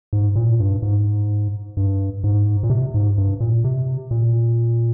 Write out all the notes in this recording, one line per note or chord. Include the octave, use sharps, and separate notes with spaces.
G#2
A#2
G2
G#2
G2
G#2
A#2
C3
G#2
G2
A#2
C3
A#2